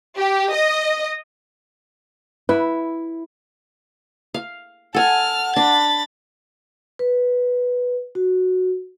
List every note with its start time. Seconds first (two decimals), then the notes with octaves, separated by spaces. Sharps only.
0.18 G4
0.53 D#5
2.49 E4 B4
4.34 F5
4.95 A4 F#5 G#5 A5 F6
5.56 D4 B5 A6
6.99 B4
8.15 F#4